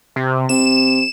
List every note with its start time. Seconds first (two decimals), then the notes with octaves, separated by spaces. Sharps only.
0.16 C3
0.49 C3 E7